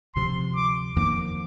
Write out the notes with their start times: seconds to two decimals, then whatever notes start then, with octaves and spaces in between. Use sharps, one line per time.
0.15 D2 C3 F3 C6
0.56 D6
0.96 F2 D#3 A#3 D6